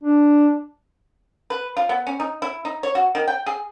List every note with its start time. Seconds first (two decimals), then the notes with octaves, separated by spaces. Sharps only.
0.03 D4
1.50 B4
1.77 F4
1.89 B3
2.07 C#4
2.20 D#4
2.42 E4
2.65 D#4
2.83 C#5
2.95 F#4
3.15 D#3
3.28 G5
3.46 G#4